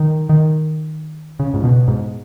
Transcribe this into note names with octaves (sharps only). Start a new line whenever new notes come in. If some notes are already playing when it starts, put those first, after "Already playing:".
Already playing: D#3
D#3
C#3
G#2
B2
G#2